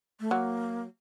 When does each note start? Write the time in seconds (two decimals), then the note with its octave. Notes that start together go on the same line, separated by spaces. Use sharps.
0.20 A3
0.31 F#3 A#3